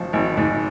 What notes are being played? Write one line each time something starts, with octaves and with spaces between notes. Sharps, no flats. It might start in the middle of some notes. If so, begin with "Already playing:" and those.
Already playing: G#1 F3
G#1
G#2